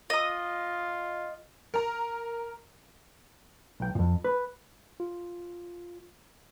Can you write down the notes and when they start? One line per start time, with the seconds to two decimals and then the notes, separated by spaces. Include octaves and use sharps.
0.10 F4 D#5 D#6
1.74 A#4 A#5
3.80 B1 G5
3.95 F2 A#2
4.24 B4
5.00 F4